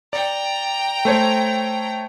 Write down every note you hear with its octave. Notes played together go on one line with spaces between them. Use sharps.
D5 G5 A#5
A3 C5 C#5